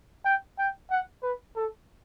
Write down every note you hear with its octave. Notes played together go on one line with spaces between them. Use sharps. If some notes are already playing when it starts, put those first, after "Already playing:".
G5
G5
F#5
B4
A4